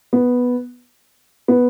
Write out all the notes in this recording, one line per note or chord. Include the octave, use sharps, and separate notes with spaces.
B3
B3